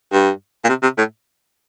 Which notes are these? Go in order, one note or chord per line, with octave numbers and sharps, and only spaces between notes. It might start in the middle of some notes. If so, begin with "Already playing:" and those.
G2
A#2
C3
C3
A2